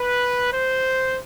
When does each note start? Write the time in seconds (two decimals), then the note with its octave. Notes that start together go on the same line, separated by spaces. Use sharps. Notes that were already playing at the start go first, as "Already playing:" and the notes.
Already playing: B4
0.53 C5